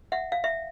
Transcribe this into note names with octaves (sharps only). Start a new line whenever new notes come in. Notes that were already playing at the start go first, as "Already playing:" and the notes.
E5 F#5
F5
E5